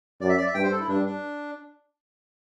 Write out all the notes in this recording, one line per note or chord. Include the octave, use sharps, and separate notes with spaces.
F#2 D5
E5
D5
E5
G2 G5
C5
A4
E4
G2 D4
D4